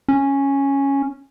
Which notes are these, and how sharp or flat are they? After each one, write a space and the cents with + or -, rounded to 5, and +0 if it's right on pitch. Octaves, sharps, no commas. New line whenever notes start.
C#4 -5